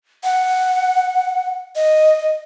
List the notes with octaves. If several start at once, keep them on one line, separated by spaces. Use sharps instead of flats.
F#5
D#5